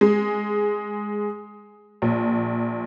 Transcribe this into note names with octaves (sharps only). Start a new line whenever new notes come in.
G#3
A#1